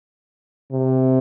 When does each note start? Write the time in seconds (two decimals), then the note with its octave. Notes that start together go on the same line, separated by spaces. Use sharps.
0.72 C3